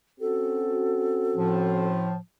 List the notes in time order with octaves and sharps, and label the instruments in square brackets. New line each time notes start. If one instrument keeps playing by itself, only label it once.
[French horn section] C4 C#4 F#4 [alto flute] A4
[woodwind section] A2 F3